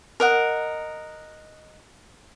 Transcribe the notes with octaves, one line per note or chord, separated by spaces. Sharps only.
A#4 D#5 F#5